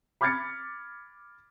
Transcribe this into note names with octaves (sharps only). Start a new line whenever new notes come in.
B5 D6 F6 G#6 A6 C#7